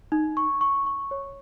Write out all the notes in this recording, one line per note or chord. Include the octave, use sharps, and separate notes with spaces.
D#4
C#6
C#6
C#6
C#5